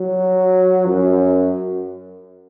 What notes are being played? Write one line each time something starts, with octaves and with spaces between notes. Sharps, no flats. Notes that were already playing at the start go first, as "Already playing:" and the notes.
Already playing: F#3
F#2